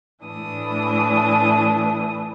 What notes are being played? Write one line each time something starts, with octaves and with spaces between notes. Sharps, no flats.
A2 E3 D4 D#6